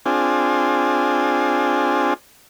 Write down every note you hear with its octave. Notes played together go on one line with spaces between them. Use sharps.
C4 D4 F4 G#4